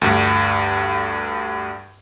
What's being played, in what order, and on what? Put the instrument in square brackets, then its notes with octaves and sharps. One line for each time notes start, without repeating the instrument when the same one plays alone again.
[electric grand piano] D2 G2